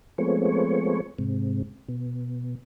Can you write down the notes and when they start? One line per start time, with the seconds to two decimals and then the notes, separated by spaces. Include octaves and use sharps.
0.18 F3 G#3 A3 B3 C4 C#5
1.19 G#2 C3
1.89 B2